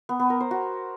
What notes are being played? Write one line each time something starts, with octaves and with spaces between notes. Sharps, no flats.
B3
B3
A#4
C5
F#4